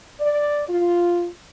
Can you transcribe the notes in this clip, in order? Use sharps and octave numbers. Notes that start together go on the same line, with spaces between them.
D5
F4